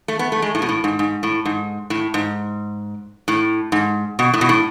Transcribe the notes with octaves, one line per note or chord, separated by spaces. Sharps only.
A3
B3
A3
G#3
A2
B2
A2
G#2
G#2
A2
G#2
A2
G#2
A2
G#2
B2
A2
B2
A2